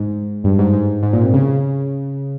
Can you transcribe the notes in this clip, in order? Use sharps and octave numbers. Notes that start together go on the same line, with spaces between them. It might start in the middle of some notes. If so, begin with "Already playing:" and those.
Already playing: G#2
G2
G#2
G#2
G#2
A#2
C3
C#3